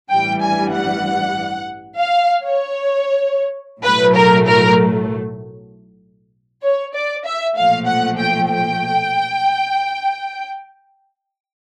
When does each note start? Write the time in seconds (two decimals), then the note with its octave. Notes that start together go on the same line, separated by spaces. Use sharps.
0.11 A1 G2 E3 G3 G5
0.42 G#5
0.74 F#5
1.97 F5
2.43 C#5
3.83 B1 A2 F#3 A3 B4
4.15 A#4
4.46 A#4
6.63 C#5
6.95 D5
7.25 E5
7.56 B1 A#2 F3 A3 F5
7.87 F#5
8.18 G5
8.49 G5